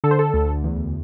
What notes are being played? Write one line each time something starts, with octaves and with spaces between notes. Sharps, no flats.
D3 A4
C5
A4
D2
E2